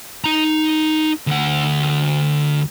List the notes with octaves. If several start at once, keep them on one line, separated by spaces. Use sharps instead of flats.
D#4 A#5
D2 F#5